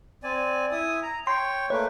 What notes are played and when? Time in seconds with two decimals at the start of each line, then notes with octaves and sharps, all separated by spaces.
0.24 C4 D5 G#5
0.72 E4 G#5 D#6
1.03 A#5
1.27 C#5 G5 C6
1.70 A3 A#3 B4 C#5